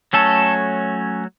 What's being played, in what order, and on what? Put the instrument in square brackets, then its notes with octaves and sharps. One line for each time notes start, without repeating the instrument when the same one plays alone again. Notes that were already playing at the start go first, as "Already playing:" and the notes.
[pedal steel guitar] F#3 A3 C#4 A4